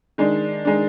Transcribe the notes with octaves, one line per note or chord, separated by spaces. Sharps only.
D#3 G#3 D4
D#3 G#3 D4